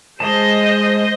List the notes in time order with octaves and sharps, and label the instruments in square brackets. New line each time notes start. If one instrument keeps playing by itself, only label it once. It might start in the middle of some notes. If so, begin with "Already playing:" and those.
[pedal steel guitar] G#3 A5 [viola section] C5 D#5